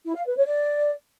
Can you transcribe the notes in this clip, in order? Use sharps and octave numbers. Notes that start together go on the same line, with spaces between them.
E4
F5
B4
C#5
D5